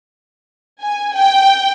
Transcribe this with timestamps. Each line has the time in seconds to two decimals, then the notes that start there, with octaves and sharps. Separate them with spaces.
0.81 G#5
1.14 G5